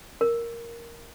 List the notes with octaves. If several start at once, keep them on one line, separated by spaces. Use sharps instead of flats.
A#4